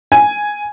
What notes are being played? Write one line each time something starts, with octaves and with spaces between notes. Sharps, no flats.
G#5